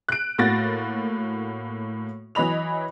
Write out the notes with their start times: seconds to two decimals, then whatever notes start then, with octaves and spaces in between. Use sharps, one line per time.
0.09 F#6 D7
0.38 A2 A#3 F#4 A6 A#6
2.35 E3 F#3 D#5 B5 F7